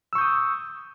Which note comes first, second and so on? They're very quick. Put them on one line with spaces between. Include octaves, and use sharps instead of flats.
E6 C#6 G6 D#6